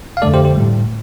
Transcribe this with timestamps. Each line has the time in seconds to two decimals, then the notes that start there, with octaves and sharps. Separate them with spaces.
0.17 F5
0.22 F2 D3 A3 A4 D5
0.34 G4 C5
0.45 G4 C5
0.55 G3
0.61 A2